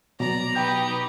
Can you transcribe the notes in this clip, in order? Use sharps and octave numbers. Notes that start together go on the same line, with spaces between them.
B2 F#3 D5 A#5
D#4 G4 B4 G5 G6